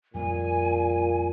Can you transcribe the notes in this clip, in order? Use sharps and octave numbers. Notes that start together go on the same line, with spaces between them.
F2 A#2 G3 C4 G#5